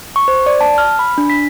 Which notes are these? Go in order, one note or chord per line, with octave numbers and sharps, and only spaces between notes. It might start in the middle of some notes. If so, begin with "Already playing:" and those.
C#6
C5
D5
A5
F6
B5
D4
B6